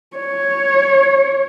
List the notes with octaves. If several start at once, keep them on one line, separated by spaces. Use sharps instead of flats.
C#5